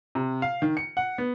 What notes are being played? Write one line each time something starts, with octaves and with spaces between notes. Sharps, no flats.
C3
F5
D#3
C#7
F#5
B3